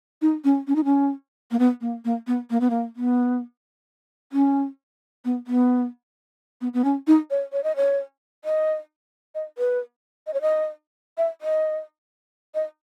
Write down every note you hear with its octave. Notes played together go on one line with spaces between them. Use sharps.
D#4
C#4
C#4
D#4
C#4
A#3
B3
A#3
A#3
B3
A#3
B3
A#3
B3
C#4
B3
B3
B3
B3
C#4
D#4
C#5
C#5
D#5
C#5
D#5
D#5
B4
D#5
C#5
D#5
E5
D#5
D#5